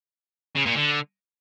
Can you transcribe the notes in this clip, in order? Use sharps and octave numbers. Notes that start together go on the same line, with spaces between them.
C#3
A#2
D3